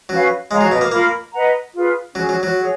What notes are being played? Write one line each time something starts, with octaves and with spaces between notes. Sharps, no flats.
F#3 C#4 F#4 B4 F5
G#3 G#4 C#5 F5 A#5
F#3
B2
A#3
A#3 F4 A#4 F5 B5
B4 D#5 F#5 A#5
F4 G#4 B4
F#3 C#4 G#4 C#5
F#3
F#3
G#4 C#5 F#5